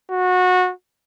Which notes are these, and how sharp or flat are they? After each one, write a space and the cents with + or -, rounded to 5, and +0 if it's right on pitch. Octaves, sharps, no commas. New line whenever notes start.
F#4 -20